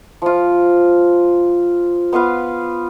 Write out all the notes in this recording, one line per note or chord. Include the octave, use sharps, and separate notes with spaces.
F3 F4
B3 F4 B4 F5